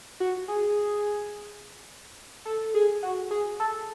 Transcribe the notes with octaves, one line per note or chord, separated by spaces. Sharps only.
F#4
G#4
A4
G#4
F#4
G#4
A4